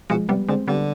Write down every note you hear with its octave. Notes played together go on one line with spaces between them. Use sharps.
B2 F3 G#3
C3 G3 B3
D3 G#3 C4
D3 G3 B3